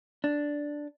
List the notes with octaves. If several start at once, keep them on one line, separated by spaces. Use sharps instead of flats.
D4